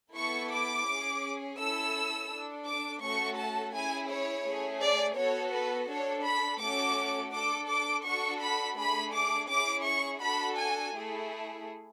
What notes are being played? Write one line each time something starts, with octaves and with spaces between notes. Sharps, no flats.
B3 E4 A4 C#6
D6
C#4 G#4
C#4 E4 A4 E6
D4 A4
D6
A3 C#4 F#4 A4 C#6
A5
C#4 E4 G#4 G#5
C#5
A3 C#4 G#4
D5
B3 F#4 A4 C#5
B4
D4 A4 C#5
B5
A3 C#4 F#4 A4 D6
D4 A4 D6
D6
D4 F#4 A4 C#6
B5
A3 D4 G#4 B5
D6
C#4 E4 G#4 D6
C#6
D4 F#4 A4 B5
G#5
A3 E4 G#4